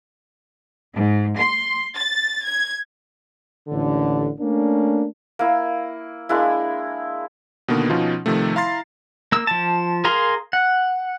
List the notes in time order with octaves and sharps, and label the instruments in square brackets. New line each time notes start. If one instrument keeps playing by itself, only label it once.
[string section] G#2
C6
A6
G#6
[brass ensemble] A1 D#2 D3
A3 A#3 C#4 D4
[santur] A#3 E4
G#3 A#3 D4 E4
[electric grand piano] B2 D3 D#3 A#3 B3
B2 F3 C#4 D#4 F4
C3 D#3 F3 A3
E4 F5 A#5 C6 A6 C7
[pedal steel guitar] A#3 E6
F3 A5
G#4 A#4 F5 A#5 C6
F#5